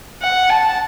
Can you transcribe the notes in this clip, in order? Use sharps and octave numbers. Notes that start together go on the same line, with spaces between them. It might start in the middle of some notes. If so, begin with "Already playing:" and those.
F#5
A5